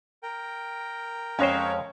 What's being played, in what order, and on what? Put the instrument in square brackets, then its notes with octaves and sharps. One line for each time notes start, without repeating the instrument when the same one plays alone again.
[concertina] A#4 G5
[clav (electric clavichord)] F2 G#3 C5 [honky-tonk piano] C#4 C#5